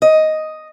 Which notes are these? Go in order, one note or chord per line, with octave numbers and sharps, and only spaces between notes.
D#5